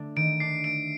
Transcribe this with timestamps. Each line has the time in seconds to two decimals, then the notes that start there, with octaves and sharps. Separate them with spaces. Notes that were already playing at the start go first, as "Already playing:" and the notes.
Already playing: D3 A3 D4
0.16 D#3 D7
0.40 D4 C7
0.64 A3 D7